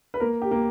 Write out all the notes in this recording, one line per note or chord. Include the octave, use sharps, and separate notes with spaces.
B4
A#3 A#4
G4
A#3